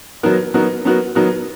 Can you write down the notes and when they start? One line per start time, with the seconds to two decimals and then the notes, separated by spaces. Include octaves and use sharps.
0.23 F#3 B3 D#4 F#4 A#4
0.54 F#3 B3 D#4 F#4 A#4
0.85 F#3 B3 D#4 F#4 A#4
1.15 F#3 B3 D#4 F#4 A#4